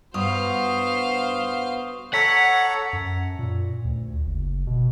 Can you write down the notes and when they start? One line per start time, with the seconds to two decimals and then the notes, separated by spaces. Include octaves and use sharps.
0.14 G2 B3 F#4 C5 F5 C#6 D#6 F7
2.14 A4 C#5 F#5 A#5 B6
2.93 F#2
3.39 A#2
3.85 D2
4.26 F#1
4.67 B2